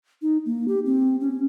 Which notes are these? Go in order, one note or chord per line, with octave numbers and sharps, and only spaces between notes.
D#4
A#3
G4
C4
C#4